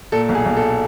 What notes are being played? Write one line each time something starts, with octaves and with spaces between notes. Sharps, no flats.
A#2 A4
B1
G#4
B1
A4